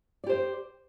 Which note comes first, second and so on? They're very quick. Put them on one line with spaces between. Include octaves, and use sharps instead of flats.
D5 G4 C5